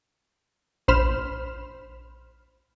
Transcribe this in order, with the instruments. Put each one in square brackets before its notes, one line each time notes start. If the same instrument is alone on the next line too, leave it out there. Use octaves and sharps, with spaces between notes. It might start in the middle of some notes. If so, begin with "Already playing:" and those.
[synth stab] A#1 C5 B5 F6 E7